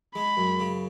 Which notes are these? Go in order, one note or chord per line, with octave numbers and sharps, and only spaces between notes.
G#3 B5
F#2
C#3